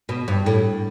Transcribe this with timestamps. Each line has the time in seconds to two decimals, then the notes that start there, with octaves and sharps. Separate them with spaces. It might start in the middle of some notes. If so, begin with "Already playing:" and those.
0.09 B2
0.28 G2
0.46 A2